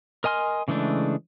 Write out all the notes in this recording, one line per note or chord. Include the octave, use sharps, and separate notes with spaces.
A#4 D#5 G#5 C6 F6
C#3 E3 G#3 A3 D4